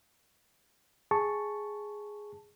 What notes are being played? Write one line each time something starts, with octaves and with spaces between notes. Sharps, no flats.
G#4 A5 C#6